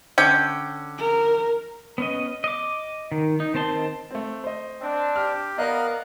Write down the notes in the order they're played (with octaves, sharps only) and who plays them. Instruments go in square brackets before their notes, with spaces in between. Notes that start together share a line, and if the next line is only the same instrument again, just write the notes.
[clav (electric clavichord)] D3 C#4 [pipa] G5
[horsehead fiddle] A#4
[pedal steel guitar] B3 C#4 D#5
D#5 D6
D#3
D#4
D#3 C4 C5 A5 C6
[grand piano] A3 C4
C5 D#5
[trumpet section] C4 D4
[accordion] G4 [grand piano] F6
[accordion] B3 F5 F#6 [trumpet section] A#4 [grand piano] D5 D#5 A#5